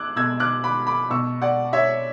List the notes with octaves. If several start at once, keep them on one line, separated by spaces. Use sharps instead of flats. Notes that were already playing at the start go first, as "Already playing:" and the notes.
Already playing: D6 E6 F#6 G#6
B2 E6 G#6
D6 F#6
B5 D6
B5 D6
B2 C#6 E6
D5 F#5
C#5 E5